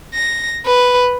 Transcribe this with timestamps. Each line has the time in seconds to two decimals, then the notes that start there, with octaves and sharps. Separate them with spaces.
0.14 A#6
0.66 B4